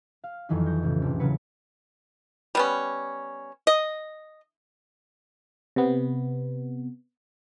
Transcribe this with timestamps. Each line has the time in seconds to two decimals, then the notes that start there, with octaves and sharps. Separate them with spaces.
0.24 F5
0.49 F2 D#3 E3 F#3 D#4
0.66 C#6 G6 A#6
0.83 A1 C#3
1.02 E1 C2 G4
1.19 C#3 F#3 B4 C#7
2.55 G3 B3 C#4
3.67 D#5
5.76 C3 B3